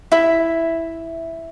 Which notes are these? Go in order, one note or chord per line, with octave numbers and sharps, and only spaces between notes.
E4 E5